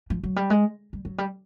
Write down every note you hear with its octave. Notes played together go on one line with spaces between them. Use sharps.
F3
F#3
G3
G#3
G3
F#3
G3